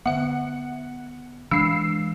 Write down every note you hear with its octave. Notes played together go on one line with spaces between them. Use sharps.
D3 B3 E5 F#5
E3 G#3 D4 F5 E6 C7